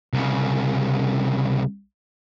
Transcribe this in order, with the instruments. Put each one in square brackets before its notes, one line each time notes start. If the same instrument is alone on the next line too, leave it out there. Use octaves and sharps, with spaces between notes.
[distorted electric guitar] C2 C#3